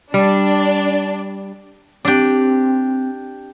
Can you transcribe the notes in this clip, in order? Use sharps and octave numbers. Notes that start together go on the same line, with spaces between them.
G3 D4
C4 D4 G4